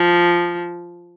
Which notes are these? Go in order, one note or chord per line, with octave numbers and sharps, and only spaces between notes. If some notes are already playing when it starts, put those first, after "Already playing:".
Already playing: F3